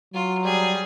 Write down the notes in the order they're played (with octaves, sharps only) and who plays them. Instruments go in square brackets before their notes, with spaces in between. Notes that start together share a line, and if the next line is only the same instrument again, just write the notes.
[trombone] F#3 [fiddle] F4
[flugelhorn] G3 [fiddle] G#4